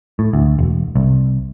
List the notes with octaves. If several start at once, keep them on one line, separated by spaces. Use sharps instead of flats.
A2
D2
E1
C2